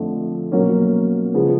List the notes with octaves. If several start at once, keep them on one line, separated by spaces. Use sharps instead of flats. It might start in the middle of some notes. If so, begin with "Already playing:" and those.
Already playing: F2 D3 F3 A3
B2 F#3 A#3 C#4
C#3 F3 G#3 B3